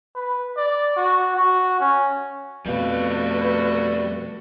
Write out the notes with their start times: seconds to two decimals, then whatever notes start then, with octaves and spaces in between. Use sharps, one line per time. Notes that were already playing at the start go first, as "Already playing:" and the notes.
0.15 B4
0.57 D5
0.96 F#4
1.37 F#4
1.80 C#4
2.66 F2 B2 G3 A3 F#4 A4 B4 F5